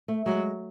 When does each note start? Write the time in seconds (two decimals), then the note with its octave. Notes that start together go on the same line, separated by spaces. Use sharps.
0.08 A3
0.26 F#3 G#3